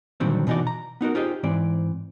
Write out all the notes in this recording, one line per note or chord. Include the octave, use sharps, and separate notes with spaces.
A#2 D3 D#3 F#3 G3 C4
B2 E3 D#4 F#4 D5
A#5
B3 D#4 F#4 A#4
D#4 F4 G4 G#4 C5 D#5
G#2 E3 C4 D5